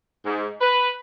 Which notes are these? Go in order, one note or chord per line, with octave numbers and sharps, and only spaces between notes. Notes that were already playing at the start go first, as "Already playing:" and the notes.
G#2
B4